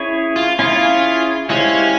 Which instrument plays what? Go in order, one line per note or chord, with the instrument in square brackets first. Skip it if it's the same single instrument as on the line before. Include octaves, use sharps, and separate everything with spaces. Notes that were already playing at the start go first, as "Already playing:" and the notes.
Already playing: [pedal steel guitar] C#4 E4 G#4 C#5
[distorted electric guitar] F4
[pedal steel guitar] C#4 E4 G#4 C#5 [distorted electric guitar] F4
[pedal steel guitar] G#3 E4 G4 C5 F5 [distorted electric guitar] C#4